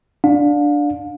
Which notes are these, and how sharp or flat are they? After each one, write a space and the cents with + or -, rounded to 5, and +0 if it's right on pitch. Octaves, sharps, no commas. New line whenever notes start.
D4 +0 F5 +35